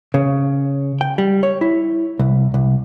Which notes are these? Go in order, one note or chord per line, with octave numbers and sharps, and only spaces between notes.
C#3
G5
G3
C#5
E4
C2
C2